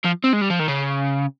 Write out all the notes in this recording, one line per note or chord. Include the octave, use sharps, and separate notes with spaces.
F3
C4
G#3
G3
F3
D#3
C#3